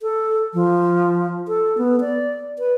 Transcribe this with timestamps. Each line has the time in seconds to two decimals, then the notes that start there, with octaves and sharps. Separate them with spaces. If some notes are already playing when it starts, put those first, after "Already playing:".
0.02 A4
0.54 F3
1.48 A4
1.78 B3
2.01 D5
2.59 B4